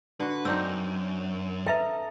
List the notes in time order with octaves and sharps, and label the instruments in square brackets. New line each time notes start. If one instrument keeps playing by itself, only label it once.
[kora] D3 F#4 [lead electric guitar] B4
[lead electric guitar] F#2 [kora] C4 D4 D#4 [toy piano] E6
[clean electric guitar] A4 D#5 A#5 [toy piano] B4 E5 G5